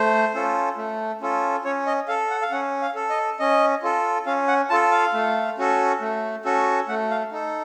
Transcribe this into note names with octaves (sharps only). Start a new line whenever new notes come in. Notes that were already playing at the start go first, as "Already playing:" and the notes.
Already playing: A3 C5
C#4 F4 A4
A3
C#4 F4 A4
C#4 C#5
D#5
A4 F5
F#5
F5
C#4 F#5
F5
A4
D#5
C#4 D#5
F4 A4
C#4 F5
F#5
F4 A4 A5
F5
A3
C#4 F#4 A4
A3
C#4 F#4 A4
A3 F#5
F5
D#4 A4